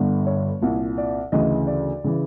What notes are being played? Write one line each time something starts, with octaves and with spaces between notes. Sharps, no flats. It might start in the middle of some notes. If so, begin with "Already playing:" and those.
Already playing: G1 G2 D3
C#5
C2 A#2
D5
D2 C#3 E3 D#5
D5
C#3 E3